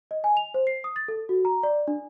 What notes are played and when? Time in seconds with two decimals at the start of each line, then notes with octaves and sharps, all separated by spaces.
0.11 D#5
0.24 G#5
0.37 F7
0.54 C5
0.67 C7
0.84 D#6
0.96 A6
1.08 A4
1.29 F#4
1.45 A#5
1.63 D5
1.88 D4